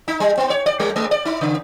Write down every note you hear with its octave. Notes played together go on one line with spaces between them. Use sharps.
D#4
G3
B3
C#5
D5
G3
G#3
D5
D#4
C#3